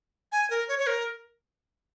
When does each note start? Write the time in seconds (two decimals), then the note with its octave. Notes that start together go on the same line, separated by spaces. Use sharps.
0.32 G#5
0.50 A#4
0.68 C#5
0.79 C#5
0.87 A#4